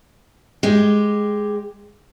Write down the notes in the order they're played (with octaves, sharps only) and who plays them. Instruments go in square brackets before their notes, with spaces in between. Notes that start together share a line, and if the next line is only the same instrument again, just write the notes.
[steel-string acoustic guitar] G#3 G4